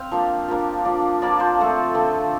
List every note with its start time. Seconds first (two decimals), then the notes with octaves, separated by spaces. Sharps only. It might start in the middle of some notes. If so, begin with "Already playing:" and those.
Already playing: C4 F5 G5
0.12 F3 A#3 D4
0.48 F3 A#3 D4
0.85 F3 A#3 D4
1.22 F3 A#3 D4 D5
1.40 C5
1.59 D3 A3 C4
1.94 D3 A3 C4